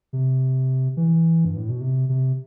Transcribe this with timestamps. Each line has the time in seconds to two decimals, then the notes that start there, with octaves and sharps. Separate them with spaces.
0.13 C3
0.97 E3
1.45 G2
1.57 A2
1.69 B2
1.81 C3
2.09 C3